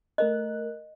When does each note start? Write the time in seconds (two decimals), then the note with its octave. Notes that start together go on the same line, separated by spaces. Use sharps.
0.18 A3 A#4 D#5 F#6